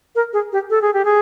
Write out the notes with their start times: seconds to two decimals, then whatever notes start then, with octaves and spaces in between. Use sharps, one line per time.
0.15 A#4
0.33 G#4
0.53 G4
0.70 A4
0.82 G#4
0.93 G4
1.05 G#4